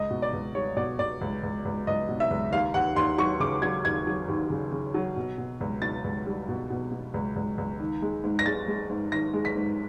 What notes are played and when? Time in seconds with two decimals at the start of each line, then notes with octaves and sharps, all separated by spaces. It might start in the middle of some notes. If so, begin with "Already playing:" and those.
Already playing: C#2 D#5
0.11 B2
0.22 D5
0.33 C#2
0.55 G3 C#5
0.77 B2 D5
0.99 B2 D5
1.21 C#2
1.43 C#2
1.65 C#2
1.87 C#2 D#5
2.09 B2
2.20 E5
2.30 C#2
2.52 D#2 F5
2.74 D#2 F#5
2.96 D#2 C6
3.18 F#3 C#6
3.40 C#3 D6
3.62 F#3 G#6
3.85 D#2 G#6
4.07 F#3
4.28 D#2
4.50 C#3
4.72 C#3
4.94 F#3
5.16 B2
5.38 B2
5.61 C#2
5.82 B2 A6
6.04 C#2
6.27 G3
6.49 B2
6.70 B2
6.92 B2
7.14 C#2
7.36 C#2
7.58 C#2
7.80 D#3
8.02 G#3
8.24 G#2
8.39 A#6
8.46 G#3 A6
8.68 G#3
8.90 G#2
9.12 D#3 A#6
9.33 G#3
9.45 B6
9.56 G#2